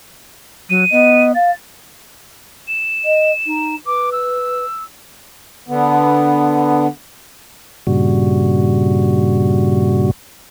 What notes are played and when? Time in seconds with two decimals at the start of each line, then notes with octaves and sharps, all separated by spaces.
0.70 F#3 D#7
0.92 B3 D#5
1.35 F5 A6
2.68 E7
3.05 D#5
3.46 D#4
3.86 B4 D6
4.12 E6
5.68 D3 B3
7.87 G2 A#2 C#3 G3 F#4